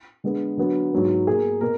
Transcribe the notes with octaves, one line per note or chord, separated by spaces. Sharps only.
D3 G#3 B3
D3 F#3 B3
G#2 F#3 B3
B2 A#3 G#4
B2 A#3 A#4